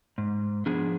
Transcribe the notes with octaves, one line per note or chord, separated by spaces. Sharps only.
G#2
F3 B3 D4 G#4